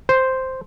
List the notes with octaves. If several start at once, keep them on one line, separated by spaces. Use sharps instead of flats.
C5